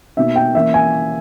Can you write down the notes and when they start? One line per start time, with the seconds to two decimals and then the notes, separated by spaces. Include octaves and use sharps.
0.17 B2 A#3 D#4 E5
0.36 G5
0.55 E3 A#3 C#4 E5
0.74 G#5